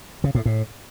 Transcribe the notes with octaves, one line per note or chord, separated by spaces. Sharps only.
C#3
A2
A2